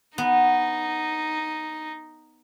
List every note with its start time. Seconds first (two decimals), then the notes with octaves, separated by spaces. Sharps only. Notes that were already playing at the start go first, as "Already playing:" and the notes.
0.18 B3 D#4